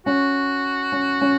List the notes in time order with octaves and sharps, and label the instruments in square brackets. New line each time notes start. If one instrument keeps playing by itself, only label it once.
[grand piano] C#4 [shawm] F#4
[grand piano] C#4
C#4